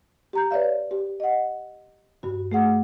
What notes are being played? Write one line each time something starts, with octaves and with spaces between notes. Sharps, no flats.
G4 A#5 G6
B4 C#5 D5 E5 F5
G4
D#5 F#5
G2 F#4
A3 G#4 F#5